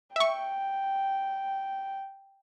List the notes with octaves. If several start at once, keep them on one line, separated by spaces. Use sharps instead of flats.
E5 G5 C#6